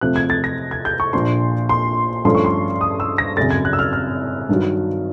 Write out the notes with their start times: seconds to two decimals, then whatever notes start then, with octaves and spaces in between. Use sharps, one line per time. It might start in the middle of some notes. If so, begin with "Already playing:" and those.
0.01 F2 C3 F3 A3 F#6
0.16 G#6
0.30 A6
0.44 A#6
0.71 G#6
0.85 G6
1.00 C#6
1.13 A#1 A#2 F3 A#3 D4 C6
1.69 C6
2.25 G2 D3 F3 A3 C#4 C6
2.35 C#6
2.45 C6
2.81 D#6
3.00 E6
3.18 A#6
3.37 G#1 F#2 C#3 A6
3.51 G#6
3.65 F#6
3.73 E6
3.79 F6
3.93 F6
4.49 G2 D#3 F#3